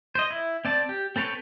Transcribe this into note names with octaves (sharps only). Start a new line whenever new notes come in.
C5 D#5
E4
C4 D5 A5
G4
C4 A4 B4 C#5 G5